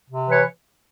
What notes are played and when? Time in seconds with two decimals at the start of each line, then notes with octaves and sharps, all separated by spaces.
0.09 C3
0.28 E3 B4 C#5